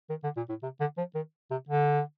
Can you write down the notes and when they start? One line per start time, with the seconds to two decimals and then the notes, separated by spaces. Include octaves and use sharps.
0.10 D#3
0.24 D3
0.37 A#2
0.49 A2
0.63 C3
0.80 D3
0.98 F3
1.15 D#3
1.51 C3
1.69 D3